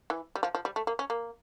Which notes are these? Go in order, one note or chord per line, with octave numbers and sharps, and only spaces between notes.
E3
G3
F3
F3
G3
A3
A#3
C#4
A#3